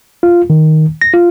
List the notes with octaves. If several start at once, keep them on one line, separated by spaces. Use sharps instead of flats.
F4
D#3
A#6
F4